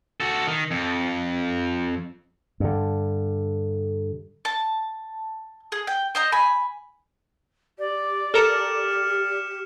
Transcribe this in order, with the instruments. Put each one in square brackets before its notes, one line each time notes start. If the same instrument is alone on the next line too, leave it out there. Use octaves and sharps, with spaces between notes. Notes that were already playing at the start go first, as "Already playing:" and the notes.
[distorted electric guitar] F#4 A4
D#3
F2
[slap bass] G2 D3
[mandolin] A5
G#4
G5
C5 D#5 A#5
G#5 B5
[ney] G4 [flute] D5
[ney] G4 [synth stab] A4 A#4 A#5 [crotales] F6 C#7 E7